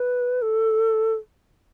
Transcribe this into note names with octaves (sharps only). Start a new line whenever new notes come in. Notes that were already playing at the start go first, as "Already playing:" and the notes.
Already playing: B4
A4